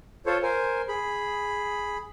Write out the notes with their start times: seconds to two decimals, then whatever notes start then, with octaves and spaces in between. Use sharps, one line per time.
0.26 F4 A4 C5 C#5
0.43 A#4 C5 G#5
0.88 G#4 B5